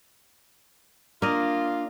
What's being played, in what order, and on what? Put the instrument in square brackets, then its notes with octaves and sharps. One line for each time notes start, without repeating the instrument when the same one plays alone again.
[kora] A#3 D#5 [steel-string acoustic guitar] D4 [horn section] F4